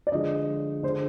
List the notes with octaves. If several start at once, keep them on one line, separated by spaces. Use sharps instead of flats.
D5
D3 F3 G#3 D#5
D3 G#3 C5